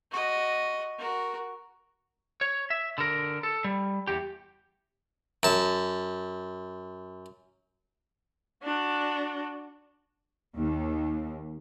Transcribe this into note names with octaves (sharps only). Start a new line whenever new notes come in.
F#4 D#5
F#4 A#4
C#5
E5
D3 A#4
A4
G3
E2 G4
F#2 A5
D4 F#4
D#2